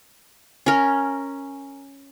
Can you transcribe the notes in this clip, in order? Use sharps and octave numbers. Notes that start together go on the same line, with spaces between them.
C#4 A#4